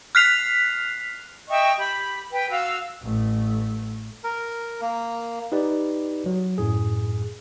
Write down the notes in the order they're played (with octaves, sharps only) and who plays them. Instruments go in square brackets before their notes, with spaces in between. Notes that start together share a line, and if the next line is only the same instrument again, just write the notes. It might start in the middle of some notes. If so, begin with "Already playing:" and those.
[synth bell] F6 F#6 B6 C7 F7
[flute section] D#5 E5 G5 C#6
G4 B5
B4 G5
F#4 F5 E6
[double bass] A1 A3
[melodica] A#4
A#3
[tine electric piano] D#4 G4 B4 D5
F#3
F#2 A2 G#4